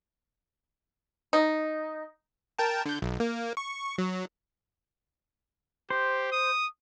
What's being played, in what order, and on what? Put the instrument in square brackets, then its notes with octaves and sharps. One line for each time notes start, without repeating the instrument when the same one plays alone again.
[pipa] D#4
[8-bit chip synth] A#4 G5 A5
D3 G6
B1
A#3
C#6
F#3
[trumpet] G4 [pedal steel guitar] C5
[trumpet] D#6